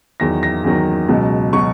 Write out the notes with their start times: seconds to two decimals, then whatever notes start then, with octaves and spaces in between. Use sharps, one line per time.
0.20 E2 D#3 F#3 A#6
0.43 A#6
0.64 E2 D#3 F#3
1.08 C#2 B2 F#3
1.53 B2 F#3 C#6